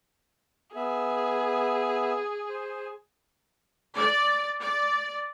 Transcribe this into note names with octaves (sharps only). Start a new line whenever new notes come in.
B3 G#4 E5
C5
D5
D5